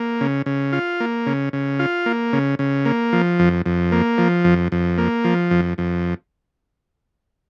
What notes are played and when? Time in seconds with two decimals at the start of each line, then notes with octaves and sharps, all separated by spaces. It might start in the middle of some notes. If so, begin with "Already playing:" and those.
Already playing: A#3
0.21 C#3
0.46 C#3
0.73 F4
1.00 A#3
1.26 C#3
1.53 C#3
1.79 F4
2.06 A#3
2.33 C#3
2.59 C#3
2.85 A#3
3.13 F3
3.39 F2
3.66 F2
3.92 A#3
4.18 F3
4.44 F2
4.72 F2
4.98 A#3
5.24 F3
5.51 F2
5.78 F2